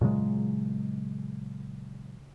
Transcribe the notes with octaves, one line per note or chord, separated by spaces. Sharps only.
A#2 C#3 F#3 G#3